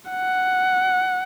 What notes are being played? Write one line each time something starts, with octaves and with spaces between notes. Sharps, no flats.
F#5